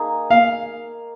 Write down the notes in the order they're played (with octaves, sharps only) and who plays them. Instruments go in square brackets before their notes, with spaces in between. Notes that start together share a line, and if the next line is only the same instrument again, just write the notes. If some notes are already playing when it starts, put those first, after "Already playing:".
Already playing: [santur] A#3 D#4 G#4
[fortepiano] F5